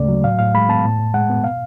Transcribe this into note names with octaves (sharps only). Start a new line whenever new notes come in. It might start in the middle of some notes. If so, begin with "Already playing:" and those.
Already playing: D2 C#3 G#3 A3 D5
F#3
A2 F5
A2 F5
G#3 B5
B3 A5
A2
A2
G#3 F#5
B3
B2 F5